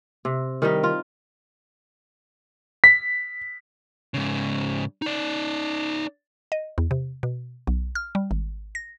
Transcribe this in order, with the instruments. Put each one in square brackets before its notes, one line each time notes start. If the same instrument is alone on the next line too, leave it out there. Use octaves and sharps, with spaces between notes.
[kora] C3
D#3 G3 D#4
F4
[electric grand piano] B6
[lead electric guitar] G#2 C#3
D#4 D5
[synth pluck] D#5
E2
C3
B2
B1
F6
G3
G#1
A#6